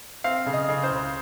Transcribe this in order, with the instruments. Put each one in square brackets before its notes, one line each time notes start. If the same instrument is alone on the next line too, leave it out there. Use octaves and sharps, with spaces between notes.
[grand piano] C4 F5
C#3
D#5
C#3
C5
C#2